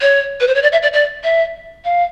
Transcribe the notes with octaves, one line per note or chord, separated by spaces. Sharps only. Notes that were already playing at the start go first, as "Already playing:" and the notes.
C#5
B4
C5
C#5
D5
E5
D5
D5
E5
F5